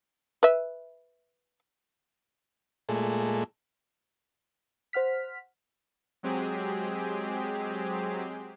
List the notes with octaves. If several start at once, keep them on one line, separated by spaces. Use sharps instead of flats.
B4 E5
A#2 G#3 A3
C5 F#5 F6 B6
F#3 G#3 C4 G4 G#4